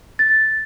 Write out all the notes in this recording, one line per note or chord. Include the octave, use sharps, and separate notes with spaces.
A6